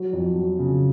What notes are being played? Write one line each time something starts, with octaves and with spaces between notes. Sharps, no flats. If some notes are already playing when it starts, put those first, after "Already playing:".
Already playing: F#3
F2
F#3
C#3